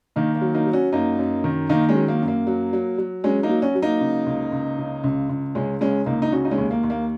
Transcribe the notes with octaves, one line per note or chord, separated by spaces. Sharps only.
D#3 A#3 D#4
A#3
F#3
A#3 D#4
F#3
C#4 F#4
F#2 A#3 D#4
F#2
D#3
D#3 A#3 D#4
G#3 C#4
F#3
A#3
F#2
A#3
F#3
F#3
F#3
F#3 G#3 C#4
A#3 D#4
F#3
C#4 F#4
F#3
A#3 D#4
C#3
C#2
C#2
C#3
C#2
C#2
C#2 G#3 C#4
C#3 G#3 C#4
C#2 A#3 D#4
D#4
C#3 C#4 F#4
D#4
G#3 C#4
D#2
A#3
D#2
A#3